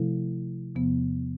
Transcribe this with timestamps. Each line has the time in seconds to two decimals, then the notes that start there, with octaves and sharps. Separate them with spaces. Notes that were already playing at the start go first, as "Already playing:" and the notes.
Already playing: C3 F3 A3 E4 A4
0.75 E2 C3 F3 B3